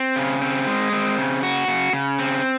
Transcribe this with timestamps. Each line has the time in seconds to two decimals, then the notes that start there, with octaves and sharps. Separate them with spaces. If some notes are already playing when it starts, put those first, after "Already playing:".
Already playing: C4
0.16 C#3
0.42 C4
0.67 G#3
0.93 C4
1.18 C#3
1.43 F#4
1.68 C#3
1.93 C#3
2.19 C4